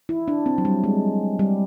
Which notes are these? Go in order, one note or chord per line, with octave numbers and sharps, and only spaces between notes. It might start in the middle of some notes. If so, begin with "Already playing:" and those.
E4
D4
C4
F#3
G3
G#3
G3